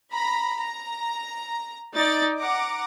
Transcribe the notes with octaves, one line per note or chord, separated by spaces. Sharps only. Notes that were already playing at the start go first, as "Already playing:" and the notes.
A#5 B5
A#5
D#4 D5 A6
F#5 A#5 D6